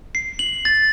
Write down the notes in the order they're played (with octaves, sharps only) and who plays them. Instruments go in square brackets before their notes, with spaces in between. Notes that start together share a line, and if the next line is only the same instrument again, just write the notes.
[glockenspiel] C7
F#7
A6